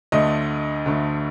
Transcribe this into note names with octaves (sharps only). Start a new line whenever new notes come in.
D2 D3 A3 D#5
D2 D3 A3